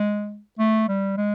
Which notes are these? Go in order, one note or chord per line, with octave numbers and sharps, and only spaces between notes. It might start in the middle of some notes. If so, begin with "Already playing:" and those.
Already playing: G#3
A3
G3
G#3